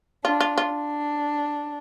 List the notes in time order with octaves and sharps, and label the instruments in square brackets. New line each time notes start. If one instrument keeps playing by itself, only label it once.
[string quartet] D4 [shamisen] F4
[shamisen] F4
F4
[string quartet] D4